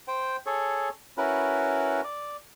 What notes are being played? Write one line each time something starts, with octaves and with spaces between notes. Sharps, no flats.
C5 G5
G#4 A4 C#5
C#4 E4 F#4 A#4 B4
D5